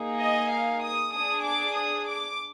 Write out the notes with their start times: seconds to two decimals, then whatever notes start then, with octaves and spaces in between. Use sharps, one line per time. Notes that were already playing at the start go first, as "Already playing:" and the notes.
Already playing: A#3 D#4 G#4
0.19 D#5
0.50 F5
0.81 D#6
1.12 D4 G#4 D#6
1.43 D6
1.75 D#6
2.06 D6